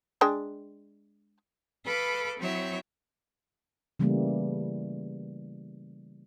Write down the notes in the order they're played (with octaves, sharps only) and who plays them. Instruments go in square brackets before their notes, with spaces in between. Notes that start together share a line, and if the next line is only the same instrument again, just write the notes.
[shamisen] G#3 D4 G5
[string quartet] A4 B4 F5 B5 D6
F#3 C4 E4 C#5 E5
[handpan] C#3 E3 G3 A3 A#3